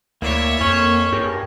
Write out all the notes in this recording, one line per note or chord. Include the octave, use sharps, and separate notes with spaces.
D2 A#3 E4 C#5 D5 E5
F2 A#3 C#4 G#5
G2 G4 G#4 A#4